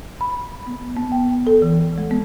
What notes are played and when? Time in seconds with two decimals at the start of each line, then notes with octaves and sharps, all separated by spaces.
0.21 B5
0.67 B3
0.96 B3
1.12 G5
1.47 A4
1.62 E3
1.98 G#3
2.11 B3